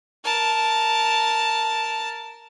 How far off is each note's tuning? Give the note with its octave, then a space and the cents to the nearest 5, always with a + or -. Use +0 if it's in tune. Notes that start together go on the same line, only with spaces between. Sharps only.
A#4 +0 A5 +0